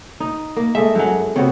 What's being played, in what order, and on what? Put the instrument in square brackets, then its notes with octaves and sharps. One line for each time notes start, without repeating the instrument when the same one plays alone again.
[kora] D#4
A#3
[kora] G#3 A3 D#4 [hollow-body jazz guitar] E5
[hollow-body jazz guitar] F#2 F#3
[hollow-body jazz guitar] C3 [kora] B3 F#4 C#5